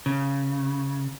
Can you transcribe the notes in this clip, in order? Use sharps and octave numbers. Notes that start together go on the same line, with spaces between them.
C#3